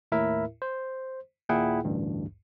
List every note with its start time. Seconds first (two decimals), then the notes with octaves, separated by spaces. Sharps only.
0.12 D#2 A2 E4 A#4 E5
0.62 C5
1.49 D#2 A#2 E4 G#4 F#5 G5
1.84 A1 D2 G2